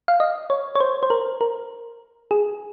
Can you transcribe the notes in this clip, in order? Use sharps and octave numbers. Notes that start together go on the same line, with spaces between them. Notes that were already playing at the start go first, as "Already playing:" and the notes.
F5
D#5
C#5
C#5
C5
C5
A#4
A#4
G#4